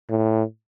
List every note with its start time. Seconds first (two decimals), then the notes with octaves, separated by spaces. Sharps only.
0.10 A2